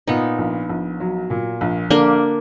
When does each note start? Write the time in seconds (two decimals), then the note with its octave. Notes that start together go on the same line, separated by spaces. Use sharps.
0.07 A#2 B3 D#4
0.38 A#1
0.69 A#1
1.00 F#3
1.30 A#2
1.61 A#1
1.90 D3 A#3 D4